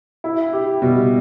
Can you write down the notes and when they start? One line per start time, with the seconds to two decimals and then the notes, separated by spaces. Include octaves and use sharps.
0.24 E4
0.53 G4
0.82 B2 G3